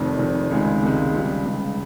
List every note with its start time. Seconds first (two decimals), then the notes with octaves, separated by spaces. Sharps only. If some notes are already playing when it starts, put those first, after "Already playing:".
Already playing: F1 F2 D#3
0.19 F1 F2 D#3
0.51 C#2 C3 D#3 G#3
0.82 C#2 C3 D#3 G#3
1.14 C#2 C#3 G3
1.45 C#2 C#3 G3